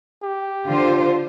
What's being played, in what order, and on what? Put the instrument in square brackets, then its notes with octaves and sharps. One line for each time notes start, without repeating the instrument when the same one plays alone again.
[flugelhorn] G4
[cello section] D3 F4 C5